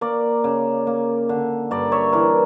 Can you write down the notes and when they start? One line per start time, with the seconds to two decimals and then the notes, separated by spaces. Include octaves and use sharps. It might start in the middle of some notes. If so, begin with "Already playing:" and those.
0.01 A#3 A#4 D5
0.44 C#3
0.87 A#3
1.29 D3
1.71 G2 A#4 D5
1.92 C#5 E5
2.13 E3 A#4 D5